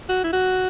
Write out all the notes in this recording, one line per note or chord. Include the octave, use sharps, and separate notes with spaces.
F#4
E4
F#4